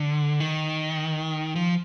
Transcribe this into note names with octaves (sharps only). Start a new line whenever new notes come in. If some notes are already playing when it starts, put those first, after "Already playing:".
Already playing: D3
D#3
F3